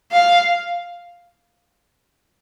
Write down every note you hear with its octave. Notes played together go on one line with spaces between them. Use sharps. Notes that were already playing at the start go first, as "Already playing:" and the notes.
F5